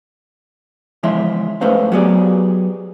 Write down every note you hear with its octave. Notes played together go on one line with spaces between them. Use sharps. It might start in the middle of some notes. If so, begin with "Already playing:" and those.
C#3 E3 F3 G#3 E5 C6
G#2 A3 C#4 B4 C5 F5
F#3 B3 G4 G#4 C#5 D5